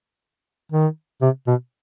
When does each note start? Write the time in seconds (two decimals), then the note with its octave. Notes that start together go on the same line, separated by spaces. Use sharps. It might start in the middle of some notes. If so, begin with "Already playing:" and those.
0.72 D#3
1.21 C3
1.47 B2